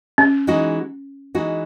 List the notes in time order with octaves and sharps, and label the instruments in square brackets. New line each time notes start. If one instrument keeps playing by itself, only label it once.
[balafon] C#4
[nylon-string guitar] E3 G#3 D#4 F#4
E3 G#3 D#4 F#4